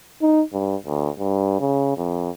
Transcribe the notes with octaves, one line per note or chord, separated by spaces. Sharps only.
D#4
G2
D2
G2
C#3
F2